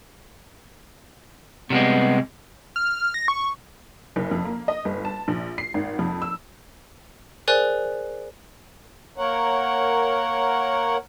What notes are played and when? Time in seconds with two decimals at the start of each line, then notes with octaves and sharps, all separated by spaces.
1.70 C3 G3 G#3 B3
2.76 F6
3.14 A#6
3.28 C#6
4.16 F#1
4.31 F2
4.45 A#3
4.68 D#5
4.85 G1
5.05 A5
5.28 A#1
5.58 C7
5.74 G#1
5.99 F2
6.22 E6
7.48 G#4 A#4 C5 D5 G#5 F#6
9.18 A#3 A#4 C#5 F#5